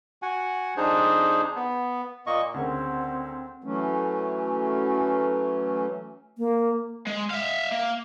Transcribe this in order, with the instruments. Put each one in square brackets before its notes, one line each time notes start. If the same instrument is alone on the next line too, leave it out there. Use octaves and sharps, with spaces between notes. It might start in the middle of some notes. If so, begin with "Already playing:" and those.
[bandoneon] F#4 F#5 G#5
F2 D4 D#4 G#4 C5
B3
A#2 A#3 D#5 C#6
[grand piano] D2 C#3 A#4 [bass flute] C4
[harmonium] E3 F#3 A3 C#4
[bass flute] A#3
[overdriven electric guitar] G#3
E5 F5
A#3